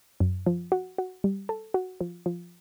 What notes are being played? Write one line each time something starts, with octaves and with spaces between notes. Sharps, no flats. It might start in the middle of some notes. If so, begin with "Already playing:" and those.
F#2
F3
F#4
F#4
G3
A4
F#4
F3
F3